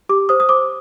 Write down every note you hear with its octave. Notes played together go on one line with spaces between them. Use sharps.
G4 D6
C5 D#6
D#6
C5 D6